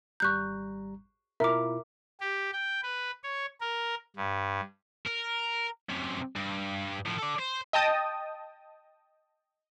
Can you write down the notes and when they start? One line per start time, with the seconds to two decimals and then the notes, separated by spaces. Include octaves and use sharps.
0.20 G#1 G3 A#5 C#6 F#6 G6
1.40 B2 E4 F4 A#4 E5 D6
2.21 G4
2.53 G5
2.83 B4
3.24 C#5
3.61 A#4
4.16 G2
5.06 A#4
5.90 F#2 C3
6.36 G2
7.06 A2 F3
7.19 A4 D5
7.39 C5
7.73 D#5 G5 A5 D#6